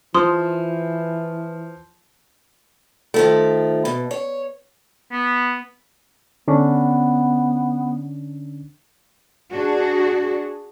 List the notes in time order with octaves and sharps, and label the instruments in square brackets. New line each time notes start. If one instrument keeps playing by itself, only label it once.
[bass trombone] E3 [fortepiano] F3 [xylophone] C6 D#6
[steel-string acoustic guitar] D#3 F3 A3
B2
C#5
[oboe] B3
[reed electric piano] D3 C#4 D4 [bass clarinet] B3
[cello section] D4 F#4 G#4